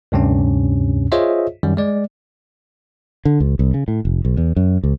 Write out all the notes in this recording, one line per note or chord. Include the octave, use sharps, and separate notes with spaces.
D2 G2 C3 C#4
F4 G#4 C5 C#5 D#5 E5
F#2 D#3 G3
G#3 D5
D3
C#2
C2
C#3
A2
F1
B1
E2
F#2
C#2